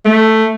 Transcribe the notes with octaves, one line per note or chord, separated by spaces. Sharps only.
A3